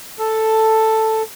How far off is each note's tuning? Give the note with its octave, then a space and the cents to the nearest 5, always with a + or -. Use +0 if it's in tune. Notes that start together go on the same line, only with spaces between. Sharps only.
A4 +5